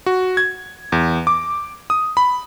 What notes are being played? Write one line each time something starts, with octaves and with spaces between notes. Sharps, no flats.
F#4
G#6
E2
D6
D#6
B5